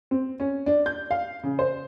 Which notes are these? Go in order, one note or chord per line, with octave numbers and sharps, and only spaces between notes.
C4
C#4
D4
G6
F5
C#3
C5